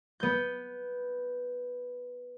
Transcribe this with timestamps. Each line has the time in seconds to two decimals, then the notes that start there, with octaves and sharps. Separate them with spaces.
0.20 B3 G6